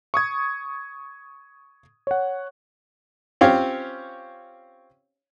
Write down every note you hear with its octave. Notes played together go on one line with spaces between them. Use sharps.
C#6 D#6 G#6
C#5 F#5
C4 C#4 F4 G4 C#5 F5